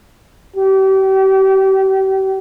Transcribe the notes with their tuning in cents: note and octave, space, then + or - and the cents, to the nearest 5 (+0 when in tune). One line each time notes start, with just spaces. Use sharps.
G4 -35